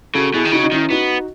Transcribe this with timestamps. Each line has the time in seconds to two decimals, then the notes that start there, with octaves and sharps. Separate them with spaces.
0.14 C#3 F#4 A4
0.34 B2 E4 G#4
0.45 D#3
0.52 C#3 D#4 F#4
0.63 D#4
0.72 D#3 C#4 E4
0.90 B3 D#4 F#4